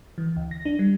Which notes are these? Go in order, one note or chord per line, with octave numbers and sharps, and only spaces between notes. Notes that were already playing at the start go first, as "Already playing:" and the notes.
E3
D2
A#6
D4
G3